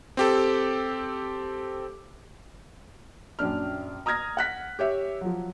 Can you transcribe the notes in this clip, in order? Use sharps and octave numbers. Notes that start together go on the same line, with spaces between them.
C4 G4 A4
A#1 F#2 D4 F6
A#5 D#6 F6 G#6 A#6
F#5 F#6 B6
G4 C#5 E5
F3 F#3